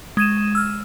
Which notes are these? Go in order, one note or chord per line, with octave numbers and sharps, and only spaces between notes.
G#3 G#6 D#7 E7
E6 F6